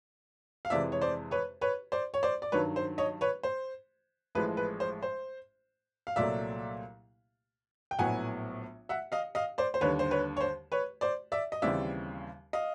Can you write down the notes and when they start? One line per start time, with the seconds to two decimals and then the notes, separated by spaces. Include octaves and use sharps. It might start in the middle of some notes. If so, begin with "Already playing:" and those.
0.65 F5
0.70 F2 C3 E3 G#3 D5 E5
0.92 C#5
1.01 C5 D5
1.31 B4 C#5
1.61 B4 C#5
1.92 C5 D5
2.14 C#5
2.23 C5 D5
2.42 D5
2.52 G2 D#3 F#3 B4 C#5
2.76 C5
2.98 C#5 D#5
3.21 B4 C#5
3.43 C5
4.35 A1 A2 F3 G#3 B4
4.57 B4
4.80 C5
5.03 C5
6.07 F5
6.16 C2 A#2 F#3 A3 D5 E5
7.91 G5
7.99 A#1 A2 F#3 B3 F#5 G#5
8.89 E5 F#5
9.12 D#5 F5
9.35 D#5 F5
9.58 C5 D5
9.74 C5
9.81 D#2 D3 G3 B4 C#5
9.99 C5
10.11 B4 C#5
10.37 C#5
10.41 C5
10.72 B4 C#5
11.01 C5 D5
11.32 D5 E5
11.52 D#5
11.62 D#2 C#3 E3 G3 C4 D5 E5
12.53 D#5 F5